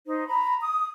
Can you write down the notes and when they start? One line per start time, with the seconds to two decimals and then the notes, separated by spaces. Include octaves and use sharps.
0.06 D#4 C5
0.27 A#5 B5
0.61 D#6